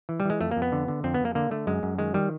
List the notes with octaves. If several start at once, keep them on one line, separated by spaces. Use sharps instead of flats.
E3
G3
E3 G#3
F2 A3
A#3
F2
B3
D3
D3
F2 C4
B3
F2
A#3
D3 A#3
D3 A3
F#2 G#3
F#2
D#3 G#3
D#3 G3